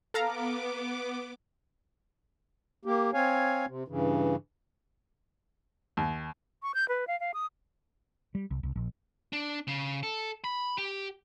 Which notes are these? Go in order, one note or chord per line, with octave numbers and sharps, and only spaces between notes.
B3 A4 F5 A#5 D6
A#3 G4
C4 C#5 F5 G#5
C3
G2 C#3 E3
D#2
C#6
G6
B4
F5
F5
D#6
G3
C2
C2
A#1
D4
C#3
A4
B5
G4